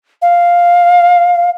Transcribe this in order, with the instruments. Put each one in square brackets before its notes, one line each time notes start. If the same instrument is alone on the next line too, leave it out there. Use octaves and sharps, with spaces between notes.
[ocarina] F5